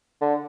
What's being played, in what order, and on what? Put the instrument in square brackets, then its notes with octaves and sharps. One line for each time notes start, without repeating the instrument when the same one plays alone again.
[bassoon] D3